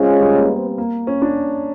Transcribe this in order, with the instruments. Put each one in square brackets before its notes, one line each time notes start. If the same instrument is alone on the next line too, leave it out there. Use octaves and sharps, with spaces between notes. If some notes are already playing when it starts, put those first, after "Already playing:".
Already playing: [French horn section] G#3 C#4 F4 G#4 C#5 [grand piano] C4
[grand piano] G3
A#3
B3
C4
C4
A#3
C#4
D4